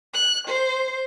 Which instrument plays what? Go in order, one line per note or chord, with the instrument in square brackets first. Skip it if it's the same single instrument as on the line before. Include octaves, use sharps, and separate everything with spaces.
[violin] F#6
C5